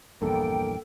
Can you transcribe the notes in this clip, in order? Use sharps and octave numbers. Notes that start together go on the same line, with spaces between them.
A#1 E2 G2 A#3 A4 G5